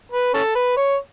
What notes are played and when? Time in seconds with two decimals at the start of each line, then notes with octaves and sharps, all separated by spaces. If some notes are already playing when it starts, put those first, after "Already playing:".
0.12 B4
0.34 C#4 A4
0.55 B4
0.77 C#5